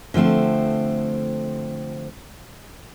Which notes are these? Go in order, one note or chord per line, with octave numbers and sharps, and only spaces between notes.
D3 F3 A3 C4